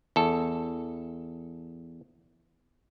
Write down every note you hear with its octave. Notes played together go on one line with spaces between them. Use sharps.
E2 A4